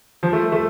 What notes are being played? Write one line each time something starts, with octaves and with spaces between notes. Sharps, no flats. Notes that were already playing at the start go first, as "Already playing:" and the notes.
F3
A3
A3